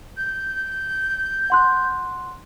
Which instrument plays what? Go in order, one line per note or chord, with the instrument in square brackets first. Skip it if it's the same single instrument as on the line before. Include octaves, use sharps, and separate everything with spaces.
[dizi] G6
[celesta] F#5 C6 F#6